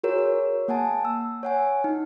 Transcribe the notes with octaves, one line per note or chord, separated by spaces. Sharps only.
F#4 G#4 A#4 C#5
C#5
A#3 F#5 G#5 A5
E6
C#5 F#5 G#5
D#4